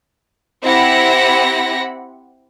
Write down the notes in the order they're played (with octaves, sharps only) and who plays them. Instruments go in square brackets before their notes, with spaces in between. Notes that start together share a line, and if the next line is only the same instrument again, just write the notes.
[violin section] C4 E4 G4 F#5 B5 A#6